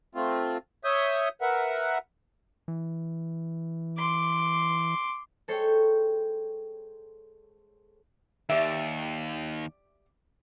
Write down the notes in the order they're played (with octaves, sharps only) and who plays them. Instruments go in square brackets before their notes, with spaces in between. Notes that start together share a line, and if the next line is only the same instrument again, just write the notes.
[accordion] A3 C4 F4
C#5 E5 D#6 G6
A#4 B4 E5 F#5
[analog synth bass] E3
[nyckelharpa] C6 D6
[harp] G#3 A4 C5 C#5 G5
[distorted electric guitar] D#2 [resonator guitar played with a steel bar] G4 D5 E5